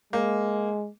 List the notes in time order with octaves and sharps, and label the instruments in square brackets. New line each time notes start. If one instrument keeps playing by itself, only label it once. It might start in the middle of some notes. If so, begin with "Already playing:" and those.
[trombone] G#3 [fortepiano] A#3